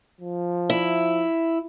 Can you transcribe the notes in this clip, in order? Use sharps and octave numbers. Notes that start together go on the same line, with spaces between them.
F3
E4